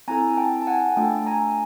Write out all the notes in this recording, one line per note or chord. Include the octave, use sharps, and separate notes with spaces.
C4 E4 A4 G#5 A#5
G5 A5
A5
F#5 G#5
A3 D4 F4 A4 G5 A5
G#5 A#5